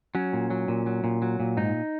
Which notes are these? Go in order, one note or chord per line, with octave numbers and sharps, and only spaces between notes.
F#3 C#4
A#2
F#3
A#2
F#3
A#2
F#3
A#2
G#2 D#4